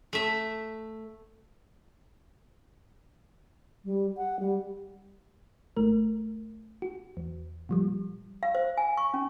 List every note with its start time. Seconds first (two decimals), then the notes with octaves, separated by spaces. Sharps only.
0.13 A3 E5
3.85 G3
4.17 F#5
4.39 G3
5.77 G#1 A3 A#4
6.82 F#4
7.17 E2
7.69 A#2 F3 G3
8.43 F5
8.55 C5
8.77 G#5
8.97 C#6
9.14 C#4